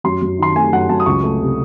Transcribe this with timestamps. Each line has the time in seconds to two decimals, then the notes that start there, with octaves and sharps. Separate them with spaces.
0.04 F#2 C6
0.22 F#2
0.39 D#3 C6
0.55 A3 G#5
0.73 F#2 F#5
0.89 F#2 A5
1.00 D#6
1.06 C#2 C#6
1.23 A3
1.41 C3